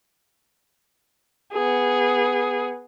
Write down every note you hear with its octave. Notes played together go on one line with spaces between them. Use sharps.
B3 G#4